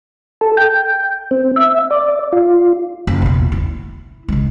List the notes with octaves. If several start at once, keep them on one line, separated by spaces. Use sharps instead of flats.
A4
G5
C4
E5
D5
F4
F#1
E2 B2
E4
C#3 G#3